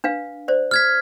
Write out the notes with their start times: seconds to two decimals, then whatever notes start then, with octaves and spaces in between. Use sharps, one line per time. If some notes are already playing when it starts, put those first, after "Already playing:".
0.04 D4 B4 F5
0.48 C5 D5
0.71 F6 G#6 B6